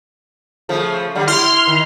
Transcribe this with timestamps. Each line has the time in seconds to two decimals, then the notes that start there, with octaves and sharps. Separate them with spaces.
0.69 C#3 F3 A3
1.15 D3 F#3 G3
1.27 E4 C6 F6
1.67 D#3